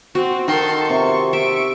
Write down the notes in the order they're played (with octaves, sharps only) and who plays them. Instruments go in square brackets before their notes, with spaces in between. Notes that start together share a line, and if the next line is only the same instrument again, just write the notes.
[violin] C4 [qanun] F#4
[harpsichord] D#3 [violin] A4 C6
[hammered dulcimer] C3 [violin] C#6
[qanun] E5 [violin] C#6 D7